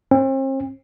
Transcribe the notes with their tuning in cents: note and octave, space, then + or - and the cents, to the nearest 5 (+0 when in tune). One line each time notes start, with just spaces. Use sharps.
C4 +40